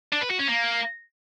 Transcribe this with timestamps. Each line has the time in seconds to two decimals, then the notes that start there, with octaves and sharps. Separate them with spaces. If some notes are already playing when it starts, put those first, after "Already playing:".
0.12 D4
0.21 B4
0.30 F#4
0.39 C#4
0.48 A#3